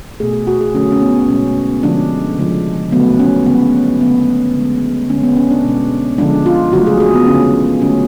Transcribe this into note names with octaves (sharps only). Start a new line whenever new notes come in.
B2 A3 G#4
G#4
F#4
G#4
D3 F#3 A3 C#4
C#4
B3
B2 G#3 C#4
D3 F3 G#3 D4
C#3 F3 G#3
D3 F#3 A3 B3
C#4
C#3 G#3 B3
D3 F#3 A3 B3
D3 G#3
D3 G#3 C#4
B3
C#4
D4
B2 G#3
D3 F3 G#3 D4
F4
C#3 F#3 A3 F#4
G#4
G#4
B3
D3 G#3 C#4
D3 F#3 A3 C#4